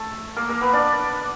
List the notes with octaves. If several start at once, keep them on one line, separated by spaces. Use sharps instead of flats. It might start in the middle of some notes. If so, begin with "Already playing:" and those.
Already playing: A3 A4
A#3 A#4
A#3 A#4
B3 B4
D4 D5